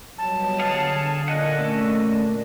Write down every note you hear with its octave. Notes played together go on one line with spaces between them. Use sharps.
F#3 G3 B3 D#5 A5
D3 G#4 F5 F#5
A#2 D4 D#5 F#5 G#5 F#6
A3 C#4 A4